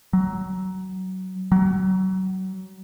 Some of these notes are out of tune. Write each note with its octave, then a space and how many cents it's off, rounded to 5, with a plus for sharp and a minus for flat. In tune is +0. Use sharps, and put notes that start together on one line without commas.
F#3 +20
F#3 +30